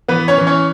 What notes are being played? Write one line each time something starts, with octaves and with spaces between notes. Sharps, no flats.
E3 B3 B4
C#4 C#5
E3
C#4 C#5